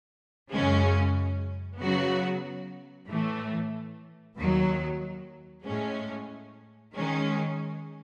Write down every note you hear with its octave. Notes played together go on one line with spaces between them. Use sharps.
F#2 C#3 G#3 C#4
C#3 F#3 B3 F#4
A2 E3 A3
D#2 D#3 F#3
A2 G#3 C#4
D#3 G#3 C#4